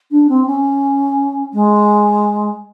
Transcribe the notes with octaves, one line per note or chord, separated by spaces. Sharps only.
D4
C4
C#4
G#3